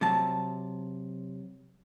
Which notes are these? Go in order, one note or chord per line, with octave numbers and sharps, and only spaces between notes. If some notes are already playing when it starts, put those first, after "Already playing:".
C3 F#3 A5